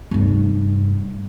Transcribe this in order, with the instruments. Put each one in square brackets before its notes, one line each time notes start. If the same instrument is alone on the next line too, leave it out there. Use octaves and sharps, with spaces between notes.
[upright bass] F1 G2